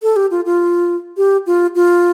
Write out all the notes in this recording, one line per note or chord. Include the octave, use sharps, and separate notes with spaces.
A4
G4
F4
F4
G4
F4
F4